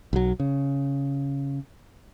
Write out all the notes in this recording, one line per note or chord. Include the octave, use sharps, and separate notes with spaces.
B1 F#3
C#3